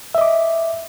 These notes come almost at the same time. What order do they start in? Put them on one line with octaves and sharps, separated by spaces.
E5 D#5 D6